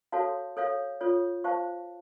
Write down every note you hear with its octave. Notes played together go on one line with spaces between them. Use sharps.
F#4 A4 C#5 F5 A5
A4 C#5 F5
F4 A4 C#5
C5 F5 A5 C#6